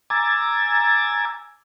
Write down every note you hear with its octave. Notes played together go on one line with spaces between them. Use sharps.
G#5 A#5 D6 E6 G#6 A6